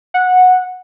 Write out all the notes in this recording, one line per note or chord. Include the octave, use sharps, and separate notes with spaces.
F#5